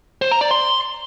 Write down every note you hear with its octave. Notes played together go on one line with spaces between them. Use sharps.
C5
A#5
D5
C6